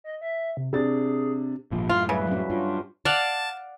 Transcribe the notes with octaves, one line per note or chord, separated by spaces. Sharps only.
D#5
E5
C3
C3 D4 G#4 A6
G#1 A#2 F3
F#2 A2 F4
C#3 G3 B4 E5
F#3 C#4
G2 F4
D5 F5 F#5 A5